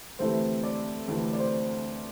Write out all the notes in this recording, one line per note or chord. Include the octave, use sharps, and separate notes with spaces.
D2 C3 E3 A3 C5
D5
D2 C3 E3 A3
D5
C5